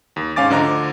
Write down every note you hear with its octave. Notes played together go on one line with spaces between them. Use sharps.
D#2
G#2 C#4 F5 G#5 D6 A6
D2 D3 F3 D#5 A#5